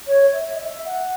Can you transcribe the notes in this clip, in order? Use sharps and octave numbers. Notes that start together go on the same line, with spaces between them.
C#5
E5
D#5
E5
F#5